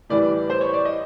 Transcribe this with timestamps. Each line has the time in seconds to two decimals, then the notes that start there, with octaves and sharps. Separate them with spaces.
0.10 A2 E3 G3 D5
0.50 C5
0.61 C#5
0.73 D5
0.85 D#5